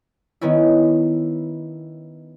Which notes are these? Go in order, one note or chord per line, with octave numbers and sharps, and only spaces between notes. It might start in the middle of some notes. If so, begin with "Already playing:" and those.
D#3 B3 C#4 E4